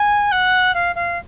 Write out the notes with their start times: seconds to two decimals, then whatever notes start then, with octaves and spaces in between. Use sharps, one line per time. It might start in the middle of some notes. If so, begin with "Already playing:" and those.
Already playing: G#5
0.31 F#5
0.74 F5
0.95 F5